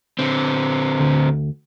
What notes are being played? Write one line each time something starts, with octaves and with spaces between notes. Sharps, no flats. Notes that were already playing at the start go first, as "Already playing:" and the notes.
D3 C4
D2